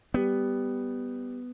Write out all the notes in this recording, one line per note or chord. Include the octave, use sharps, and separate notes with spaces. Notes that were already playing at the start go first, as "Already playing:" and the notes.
G3 B3